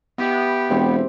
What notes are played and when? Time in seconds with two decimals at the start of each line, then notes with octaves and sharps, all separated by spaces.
0.18 B3 E4 G4
0.70 E1 C3 C4 D6